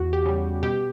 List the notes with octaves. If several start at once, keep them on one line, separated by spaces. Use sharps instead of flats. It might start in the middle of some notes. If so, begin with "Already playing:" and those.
Already playing: E2 F#4
G4
C#3 G3
B2 G4